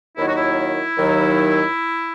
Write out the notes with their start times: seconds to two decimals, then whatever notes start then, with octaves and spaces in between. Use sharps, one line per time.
0.17 D#2 D#3 F#3 E4
0.27 F#4
0.37 E4
0.98 D#2 D#3 F#3